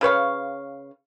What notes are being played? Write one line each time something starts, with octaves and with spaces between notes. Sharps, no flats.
C#3 B4 C#5 F5